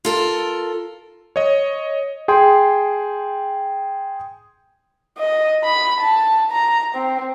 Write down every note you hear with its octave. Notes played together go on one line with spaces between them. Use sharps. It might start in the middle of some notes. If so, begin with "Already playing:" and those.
F4 A4 A#4
C#5 D#5
G#4 G5 C6
D#5
B5
A5
A#5
C4